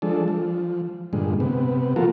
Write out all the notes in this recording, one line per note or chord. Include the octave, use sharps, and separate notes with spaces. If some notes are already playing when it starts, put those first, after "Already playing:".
F3 G#3 D4 A4
F3
G2 A#2 D3 G#3
C3 B3
F3 A#3 F4 F#4 A4 A#4